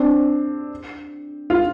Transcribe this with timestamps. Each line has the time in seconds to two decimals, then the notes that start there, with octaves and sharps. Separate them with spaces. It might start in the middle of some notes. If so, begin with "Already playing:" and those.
Already playing: C4 D4
1.50 F4